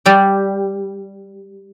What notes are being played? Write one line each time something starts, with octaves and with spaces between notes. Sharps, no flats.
G3 D5